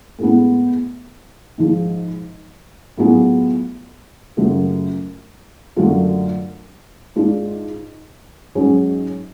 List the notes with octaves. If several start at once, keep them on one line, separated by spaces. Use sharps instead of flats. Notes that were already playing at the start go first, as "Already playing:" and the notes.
A2 G#3 B3
G#2 F3 G#3
A2 F#3 B3 F4 G#4
F#2 C#3 F#3 A3 F4
F#2 D3 F#3 A3 F4
G#2 G#3 D4 F4
G#2 F#3 C#4 G#4